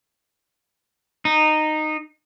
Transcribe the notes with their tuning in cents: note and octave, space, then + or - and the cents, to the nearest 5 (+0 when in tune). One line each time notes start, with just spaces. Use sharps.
D#4 -15